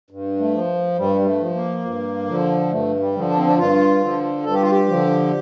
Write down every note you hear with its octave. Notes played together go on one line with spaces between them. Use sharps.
G2
A3
F3
G2 G3
G3
A3
F3
A#3
G2
D3 F3
G2 A3
G3
D3 F3
D4
C4
D4
G2 F4
D3 F3
G2 A4
G4
F4
G4
D3 F3